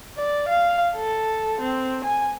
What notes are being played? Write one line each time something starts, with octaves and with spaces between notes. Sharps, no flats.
D5
F5
A4
C4
G#5